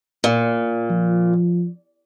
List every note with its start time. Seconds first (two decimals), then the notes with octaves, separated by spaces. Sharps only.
0.24 A#2
0.90 F3